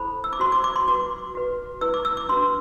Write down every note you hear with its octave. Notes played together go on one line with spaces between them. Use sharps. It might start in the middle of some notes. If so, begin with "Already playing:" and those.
Already playing: E4 A4 C5 B5
E6
D6
F#4 C5 C6
D6
D6
C6
F#4 B4 D6
F#4 B4
E4 B4 E6
D6
E6
D6
D4 F#4 B4 C6